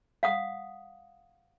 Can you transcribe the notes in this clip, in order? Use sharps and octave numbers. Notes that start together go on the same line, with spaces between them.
F5 F#5 D#6